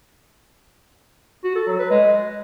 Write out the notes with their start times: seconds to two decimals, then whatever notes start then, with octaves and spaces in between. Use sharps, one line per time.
1.44 F#4
1.55 A4
1.67 F#3
1.79 B4
1.90 G#3